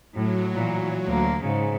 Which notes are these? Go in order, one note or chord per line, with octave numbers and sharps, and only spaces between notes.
A2 F#3
A#2 E3
D2 A#3
G#2 C#3